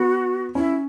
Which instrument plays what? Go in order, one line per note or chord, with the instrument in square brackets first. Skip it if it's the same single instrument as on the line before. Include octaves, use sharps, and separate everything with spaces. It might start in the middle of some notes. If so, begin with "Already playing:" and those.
Already playing: [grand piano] B3 [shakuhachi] F#4
[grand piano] C#4 [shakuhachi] E4